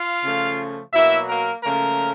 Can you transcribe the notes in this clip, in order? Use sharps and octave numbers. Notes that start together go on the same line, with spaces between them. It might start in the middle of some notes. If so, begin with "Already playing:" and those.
Already playing: F4 F5
C#3 F3 A3
B2 F#3 A#3 E4 E5
A#3 A#4
C#3 F3 A3 A#3 C#4 A#4